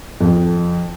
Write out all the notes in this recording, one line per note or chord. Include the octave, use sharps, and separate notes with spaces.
F2